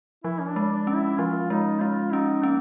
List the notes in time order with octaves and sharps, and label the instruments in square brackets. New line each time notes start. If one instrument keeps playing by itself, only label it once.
[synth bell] F3 [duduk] E4
[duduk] C#4
D4
[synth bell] G#3
[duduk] D4
[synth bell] C#4
[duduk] E4
[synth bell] F3 [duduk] F4
[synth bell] G#3 [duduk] D#4
[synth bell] G#3 [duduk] F4
[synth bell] C#4 [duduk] D#4
[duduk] A#3 [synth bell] C#4